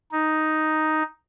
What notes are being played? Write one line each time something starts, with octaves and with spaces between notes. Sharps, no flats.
D#4